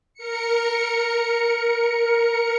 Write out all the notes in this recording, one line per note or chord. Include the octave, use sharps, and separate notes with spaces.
A#4 C#7